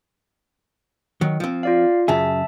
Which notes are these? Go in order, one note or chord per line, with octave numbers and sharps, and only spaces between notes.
D#3 F#3
F3 C4
F4 D5 F5
F#2 C#3 G#4 E5 A5